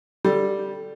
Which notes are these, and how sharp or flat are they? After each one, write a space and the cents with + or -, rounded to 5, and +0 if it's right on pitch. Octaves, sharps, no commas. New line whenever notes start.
D3 +0 G3 +0